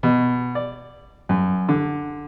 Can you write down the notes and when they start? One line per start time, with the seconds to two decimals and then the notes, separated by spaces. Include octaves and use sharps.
0.03 B2
0.55 D5
1.29 F#2
1.69 D3